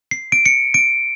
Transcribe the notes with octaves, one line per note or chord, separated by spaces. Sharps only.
C7
D7
C#7
D7